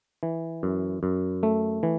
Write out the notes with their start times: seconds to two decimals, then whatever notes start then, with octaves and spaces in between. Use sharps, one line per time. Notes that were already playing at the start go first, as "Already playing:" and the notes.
0.23 E3
0.63 F#2
1.03 F#2
1.43 A3
1.83 E3